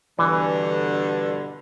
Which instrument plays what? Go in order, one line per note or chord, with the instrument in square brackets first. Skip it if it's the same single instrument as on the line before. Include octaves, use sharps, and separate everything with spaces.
[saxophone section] G2 B2 D3 [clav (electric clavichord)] E3